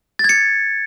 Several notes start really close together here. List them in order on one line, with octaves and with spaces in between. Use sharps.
A6 G#6 C#7